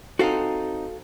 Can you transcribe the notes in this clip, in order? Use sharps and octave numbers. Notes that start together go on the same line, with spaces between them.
C4 D#4 F#4 A4 F5